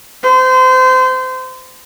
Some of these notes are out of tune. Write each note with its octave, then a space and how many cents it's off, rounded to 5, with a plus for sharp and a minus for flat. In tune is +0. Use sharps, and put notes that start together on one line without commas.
C5 -30